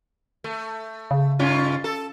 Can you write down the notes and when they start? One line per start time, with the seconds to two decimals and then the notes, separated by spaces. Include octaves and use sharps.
0.44 A3
1.11 C#3
1.39 G2 C#4 F4
1.84 A4